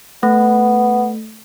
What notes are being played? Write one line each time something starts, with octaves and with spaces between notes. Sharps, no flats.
A3 B3